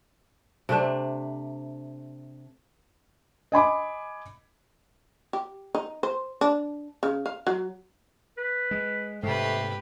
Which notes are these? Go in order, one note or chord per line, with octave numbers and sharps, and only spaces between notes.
C3 A3 D4
D#5 G#5 B5 D6
G4
D#4
C5
D4
C#3
F5
F#3
B4
G#3
G#2 C3 A3 G4 B4 C5